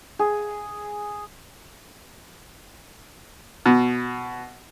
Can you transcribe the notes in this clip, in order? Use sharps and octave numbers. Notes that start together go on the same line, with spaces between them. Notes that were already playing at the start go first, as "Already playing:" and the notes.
G#4
B2